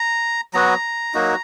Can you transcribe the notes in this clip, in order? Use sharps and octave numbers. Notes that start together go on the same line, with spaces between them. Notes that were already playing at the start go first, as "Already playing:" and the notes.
Already playing: A#5
F#3 B3 F#4 A#5
F#3 A#3 D#4 F#4